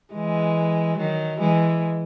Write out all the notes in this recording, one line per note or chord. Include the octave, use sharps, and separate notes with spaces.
E3 G#3
D#3 F#3
E3 G#3